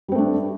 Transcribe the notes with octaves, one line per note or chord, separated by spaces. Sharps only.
G3 A3 C4 D4